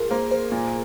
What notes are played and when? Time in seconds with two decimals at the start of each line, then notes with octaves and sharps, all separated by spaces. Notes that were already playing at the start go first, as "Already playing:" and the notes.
Already playing: F4 G#4 A#4
0.11 A#3 C5
0.31 C5
0.52 A#2